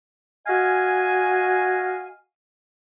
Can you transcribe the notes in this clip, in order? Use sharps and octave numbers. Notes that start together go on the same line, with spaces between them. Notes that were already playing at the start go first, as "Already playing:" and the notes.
F#4 D#5 F5 G#5